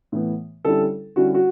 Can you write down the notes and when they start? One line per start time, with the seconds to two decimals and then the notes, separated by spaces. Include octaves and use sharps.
0.12 A2 E3 B3
0.65 D3 G3 C#4 E4 A4
1.16 D3 G3 C#4 E4 F#4
1.34 F#4